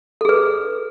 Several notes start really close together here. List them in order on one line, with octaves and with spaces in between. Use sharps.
A4 G#4 B4